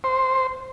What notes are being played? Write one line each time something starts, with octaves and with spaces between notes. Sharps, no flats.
C5